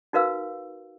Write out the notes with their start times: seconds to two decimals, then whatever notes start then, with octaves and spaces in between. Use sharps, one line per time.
0.13 D#4 F#4 A#4 B4 F5 E6